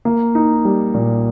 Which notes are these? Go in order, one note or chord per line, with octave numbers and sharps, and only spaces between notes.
A#3
D#4
G3
A#2